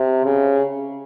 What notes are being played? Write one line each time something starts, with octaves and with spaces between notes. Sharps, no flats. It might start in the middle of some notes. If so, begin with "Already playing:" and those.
Already playing: C3
C#3